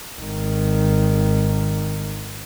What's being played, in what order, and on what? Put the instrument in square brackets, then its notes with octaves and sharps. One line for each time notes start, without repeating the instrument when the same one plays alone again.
[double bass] G#1 D#3